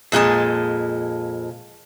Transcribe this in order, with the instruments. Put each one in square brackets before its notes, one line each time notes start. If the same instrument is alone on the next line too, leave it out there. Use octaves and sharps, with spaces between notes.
[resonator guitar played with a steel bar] F2 A#2 G#3 A5